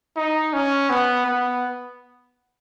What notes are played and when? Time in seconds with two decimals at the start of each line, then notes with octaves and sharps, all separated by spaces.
0.16 D#4
0.53 C#4
0.90 B3
1.26 B3